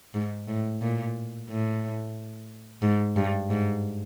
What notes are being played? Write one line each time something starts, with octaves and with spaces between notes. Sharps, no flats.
G#2
A2
A#2
A2
G#2
G2
G#2